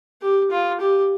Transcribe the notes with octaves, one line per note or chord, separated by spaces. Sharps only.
G4
F4
G4